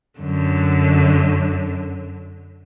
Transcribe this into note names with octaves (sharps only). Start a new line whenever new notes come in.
F#2 D3